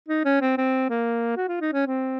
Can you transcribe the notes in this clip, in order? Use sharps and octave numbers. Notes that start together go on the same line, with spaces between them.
D#4
C#4
C4
C4
A#3
F#4
F4
D#4
C#4
C4